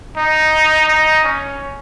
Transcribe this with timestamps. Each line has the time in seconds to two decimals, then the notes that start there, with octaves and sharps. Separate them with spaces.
0.16 D#4
0.88 D#4
1.24 C#4